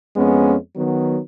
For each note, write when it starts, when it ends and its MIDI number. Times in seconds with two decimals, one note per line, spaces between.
0.17 0.56 41
0.17 0.56 56
0.17 0.56 59
0.17 0.56 61
0.76 1.19 51
0.76 1.19 54
0.76 1.19 59